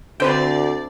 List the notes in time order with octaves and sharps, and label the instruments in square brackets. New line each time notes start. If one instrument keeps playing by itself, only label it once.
[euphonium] D2 [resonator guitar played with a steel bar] D3 [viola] C4 D5 [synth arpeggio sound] B4 C5 G5